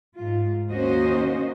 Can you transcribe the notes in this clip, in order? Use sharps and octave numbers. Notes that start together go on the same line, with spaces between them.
G#2 F4
D#2 A#3 C#4 F#4 C5 D#5